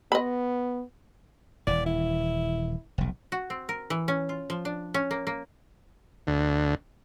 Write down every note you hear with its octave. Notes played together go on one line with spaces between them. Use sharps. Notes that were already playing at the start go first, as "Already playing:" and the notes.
B3 D#5 B5
D#1 E3 D5
E4
F1 B1
F#4
C4
A#4
E3
C#4
F4
F3
D4
C#4
A#3
A#3
D2